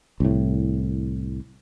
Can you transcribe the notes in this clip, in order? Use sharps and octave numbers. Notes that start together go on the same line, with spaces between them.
C2 A2